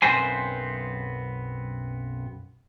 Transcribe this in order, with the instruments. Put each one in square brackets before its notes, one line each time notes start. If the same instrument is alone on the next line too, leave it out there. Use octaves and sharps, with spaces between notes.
[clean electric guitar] B1 F#2 B3 C4 C5 G#5